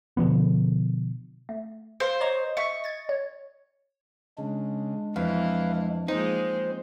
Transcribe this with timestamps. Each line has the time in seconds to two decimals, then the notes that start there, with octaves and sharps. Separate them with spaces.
0.17 B2 D3 F3 B3
1.49 A3
2.00 C5 F5
2.21 C#5 D#5 A#5 C#6
2.57 E5 C#6
2.84 G#6 A6
3.09 C#5
4.38 C#3 G#3 D4
5.16 F2 E3 E4 B4 F5
6.08 F3 G#3 A#3 C4 D#4 C5